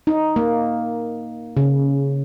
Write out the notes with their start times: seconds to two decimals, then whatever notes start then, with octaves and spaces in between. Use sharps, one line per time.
0.07 D#4
0.36 A#3
1.57 C#3